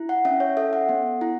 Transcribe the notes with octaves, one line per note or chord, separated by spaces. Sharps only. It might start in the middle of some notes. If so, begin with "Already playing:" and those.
Already playing: E4
F#5
C#4 E5
C#5
A4 E5
F#5
B3
E4